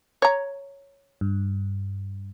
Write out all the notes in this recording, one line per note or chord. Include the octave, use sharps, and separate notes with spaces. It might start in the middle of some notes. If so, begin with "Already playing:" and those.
C#5 A#5
G2